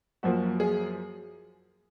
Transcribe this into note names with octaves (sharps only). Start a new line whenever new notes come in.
F#2 F3 A#3 F#4
G#4